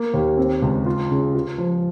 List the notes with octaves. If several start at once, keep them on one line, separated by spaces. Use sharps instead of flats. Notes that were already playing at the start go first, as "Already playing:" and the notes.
Already playing: A#3
D#2
C4
C#2
F4
C#3
F4
F3